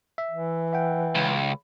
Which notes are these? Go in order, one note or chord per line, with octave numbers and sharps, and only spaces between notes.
E5
E3
E5 F#5 G5
C#2